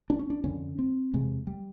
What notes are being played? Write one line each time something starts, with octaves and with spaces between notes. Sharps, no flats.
D4
C#4
D4
F2 D3 C#4
C4
E2 C3 G#3
G3